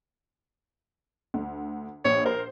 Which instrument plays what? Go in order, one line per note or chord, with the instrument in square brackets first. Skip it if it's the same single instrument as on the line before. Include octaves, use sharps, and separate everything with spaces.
[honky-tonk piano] D2
[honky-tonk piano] A#1 [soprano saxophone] C#5
[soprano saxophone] A#4 [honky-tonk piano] C5